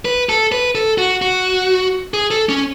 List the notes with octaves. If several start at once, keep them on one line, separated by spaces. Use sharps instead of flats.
B4
A4
B4
A4
F#4
F#4
G#4
A4
C#4